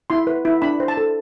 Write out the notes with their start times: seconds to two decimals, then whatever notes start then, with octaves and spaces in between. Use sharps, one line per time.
0.10 E4 C6
0.27 B4
0.45 E4
0.62 D4 B5
0.80 C5
0.88 A5
0.97 A4